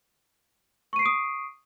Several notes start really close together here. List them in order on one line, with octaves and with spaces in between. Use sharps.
C#6 D#7 C7 D7 D#6